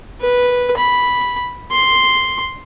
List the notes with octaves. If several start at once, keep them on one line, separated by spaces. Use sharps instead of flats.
B4
B5
C6